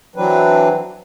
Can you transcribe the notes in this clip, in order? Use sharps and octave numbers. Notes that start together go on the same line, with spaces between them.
E3 F#3 C4 D4 B4